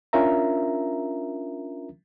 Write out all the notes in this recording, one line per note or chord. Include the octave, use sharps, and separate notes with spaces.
C#4 D4 F4 A#4 E5 A#5